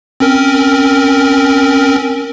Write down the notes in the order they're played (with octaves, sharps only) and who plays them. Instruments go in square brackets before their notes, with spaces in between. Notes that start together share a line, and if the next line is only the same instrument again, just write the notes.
[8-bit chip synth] C4 C#4 A#4